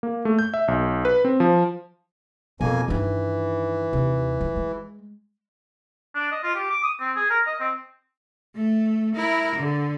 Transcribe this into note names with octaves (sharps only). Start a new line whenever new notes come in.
A#3
A3
G6
E5
B1
B4
C4
F3
F2 B2 A#3 G#5
G2 D#3 E3
D#2 C3
F3
G#3
D4
D#5
F4
G4
D6
D#6
C4
G#4
A#4
D#5
C4
A3
E4 A#4
D3